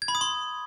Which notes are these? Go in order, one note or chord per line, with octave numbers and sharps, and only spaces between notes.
G#6
B5
D#6
C6